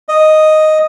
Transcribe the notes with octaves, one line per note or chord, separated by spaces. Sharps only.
D#5